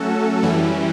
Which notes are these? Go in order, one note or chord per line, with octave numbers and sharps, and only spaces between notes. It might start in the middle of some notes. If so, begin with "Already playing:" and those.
Already playing: F#3 A3 C#4 F#4 A4
F#2 E3 G3 C#4 E4